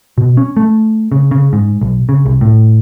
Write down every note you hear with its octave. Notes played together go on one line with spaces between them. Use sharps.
B2
C#4
A3
C#3
C#3
G#2
B1
C#3
C2
A2